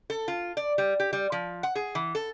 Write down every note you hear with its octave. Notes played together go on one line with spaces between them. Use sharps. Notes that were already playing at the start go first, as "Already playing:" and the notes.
A4
F4
D5
G3
G4
G3
F3
F#5
G#4
E3
A4